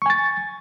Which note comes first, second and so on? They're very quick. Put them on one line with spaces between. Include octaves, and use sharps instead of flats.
C#6 G#5 A6